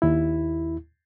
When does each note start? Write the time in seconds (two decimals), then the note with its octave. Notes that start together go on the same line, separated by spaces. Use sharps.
0.02 D#2 E4